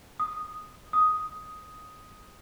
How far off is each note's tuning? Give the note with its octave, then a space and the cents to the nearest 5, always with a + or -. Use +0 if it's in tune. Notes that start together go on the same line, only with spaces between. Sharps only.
D#6 -5
D#6 +5